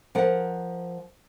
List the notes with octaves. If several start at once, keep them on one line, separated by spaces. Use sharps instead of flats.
F3 A#4 F#5